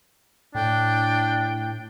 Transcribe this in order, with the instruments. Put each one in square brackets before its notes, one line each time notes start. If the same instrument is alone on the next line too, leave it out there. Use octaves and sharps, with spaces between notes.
[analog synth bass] A2 [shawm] D4 [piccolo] G5